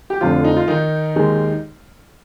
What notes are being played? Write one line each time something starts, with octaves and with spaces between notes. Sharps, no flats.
G4
F1 F2 D3 F3 F4
D#4
F4
D#3 D#4
D#2 D#3 G#3